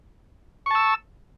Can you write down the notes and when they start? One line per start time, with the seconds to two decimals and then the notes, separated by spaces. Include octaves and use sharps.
0.66 C#6
0.71 A5
0.75 E6